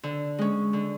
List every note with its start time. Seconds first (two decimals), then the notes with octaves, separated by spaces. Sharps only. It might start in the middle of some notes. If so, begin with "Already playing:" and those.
0.03 D3
0.38 G#3 C#4
0.73 D3